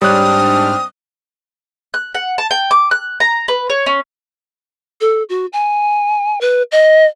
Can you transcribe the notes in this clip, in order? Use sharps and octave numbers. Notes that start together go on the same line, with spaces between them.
G#2 G3 C4 D4 C#5 D#6 F6 F#6
F#6
F#5
A5
G5
D6
F#6
A#5
B4
C#5
C#4
A4
F#4
G#5
B4
D#5